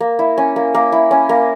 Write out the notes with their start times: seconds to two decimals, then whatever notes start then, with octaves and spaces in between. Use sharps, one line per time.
0.01 A#3
0.19 E4
0.38 C#4
0.56 A#3
0.75 A#3
0.92 E4
1.11 C#4
1.29 A#3